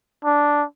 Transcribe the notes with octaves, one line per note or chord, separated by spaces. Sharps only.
D4